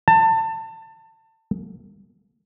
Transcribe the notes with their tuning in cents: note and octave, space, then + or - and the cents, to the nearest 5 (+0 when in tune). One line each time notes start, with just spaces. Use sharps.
A5 +25